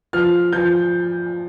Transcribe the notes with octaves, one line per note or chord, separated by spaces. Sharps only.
F3 F6
F3 G6